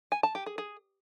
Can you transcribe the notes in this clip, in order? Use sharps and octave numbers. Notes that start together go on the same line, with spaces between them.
G#5
A5
G4
G#4
G#4